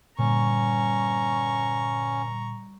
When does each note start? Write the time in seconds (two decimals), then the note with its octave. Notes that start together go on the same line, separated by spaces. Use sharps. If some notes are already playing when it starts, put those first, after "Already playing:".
0.19 G2 A#2 D3 C#4 A#5 C#6